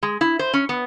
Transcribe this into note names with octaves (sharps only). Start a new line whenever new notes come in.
G#3
E4
C5
C#4
B3